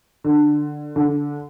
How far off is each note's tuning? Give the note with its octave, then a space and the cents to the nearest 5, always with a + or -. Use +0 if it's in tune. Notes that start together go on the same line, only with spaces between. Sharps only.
D3 +15
D3 -20